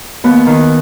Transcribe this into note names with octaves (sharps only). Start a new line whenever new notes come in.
D#2 B3
D#3